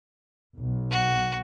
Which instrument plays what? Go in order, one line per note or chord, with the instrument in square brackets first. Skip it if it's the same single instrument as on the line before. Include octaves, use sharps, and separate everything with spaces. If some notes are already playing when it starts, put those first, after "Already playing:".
[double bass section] B1
[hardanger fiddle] F#4